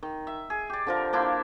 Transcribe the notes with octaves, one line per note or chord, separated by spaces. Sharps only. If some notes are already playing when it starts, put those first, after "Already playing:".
D#3
E5
G#4
G4 D5
D3 F3 A#4
A#3 D4 E4 C5